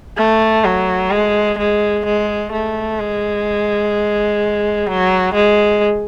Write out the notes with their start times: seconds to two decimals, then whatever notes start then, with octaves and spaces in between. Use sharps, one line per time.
0.17 A3
0.65 F#3
1.11 G#3
1.58 G#3
2.05 G#3
2.52 A3
2.99 G#3
4.87 F#3
5.34 G#3